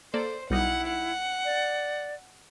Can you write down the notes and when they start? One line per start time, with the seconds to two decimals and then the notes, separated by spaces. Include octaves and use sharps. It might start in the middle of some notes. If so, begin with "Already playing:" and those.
0.14 A#3 A4 C5 D5
0.50 B1 G3 D#4 E4 F#5
0.87 F#5
1.45 D5